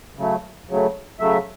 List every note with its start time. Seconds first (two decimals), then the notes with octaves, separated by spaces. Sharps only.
0.17 C#3 F#3 A3
0.69 C#3 F#3 A3
1.19 C#3 F#3 A3 E5